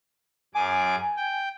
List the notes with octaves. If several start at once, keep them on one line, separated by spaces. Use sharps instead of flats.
F#2 G#4 G#5 D6
G5